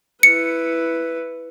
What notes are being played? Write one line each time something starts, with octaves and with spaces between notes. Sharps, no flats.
E4 B4 C#7